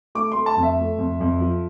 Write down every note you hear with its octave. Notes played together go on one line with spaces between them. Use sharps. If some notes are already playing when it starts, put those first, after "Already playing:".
A3 D6
A3 C6
A5
F2
E5
A3
F2
F2
F3